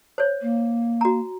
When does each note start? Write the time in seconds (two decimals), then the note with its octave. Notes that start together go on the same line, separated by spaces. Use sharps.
0.18 C5 C#5
0.42 A#3
1.01 F#4 A#5